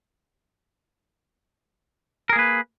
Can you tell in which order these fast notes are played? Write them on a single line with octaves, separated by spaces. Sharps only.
A#4 G#4 A#3 B4